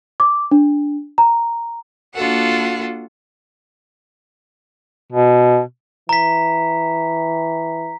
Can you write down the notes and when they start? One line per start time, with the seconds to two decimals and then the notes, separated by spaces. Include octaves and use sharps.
0.20 D6
0.51 D4
1.18 A#5
2.15 A#3 D4 F4 F#4 A4 F#5
5.12 B2
6.09 E3 A#5 B6